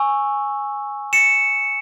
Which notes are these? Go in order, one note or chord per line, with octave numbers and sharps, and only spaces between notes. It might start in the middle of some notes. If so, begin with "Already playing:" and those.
Already playing: G#5 C#6 E6
C#7 E7